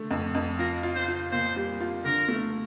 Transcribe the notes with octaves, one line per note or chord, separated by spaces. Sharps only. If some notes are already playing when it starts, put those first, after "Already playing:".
Already playing: D3 A3
F2
F2
F4 A#4
F4
C5
F4
A#2 C5
G3
F4
D3 A#4
A3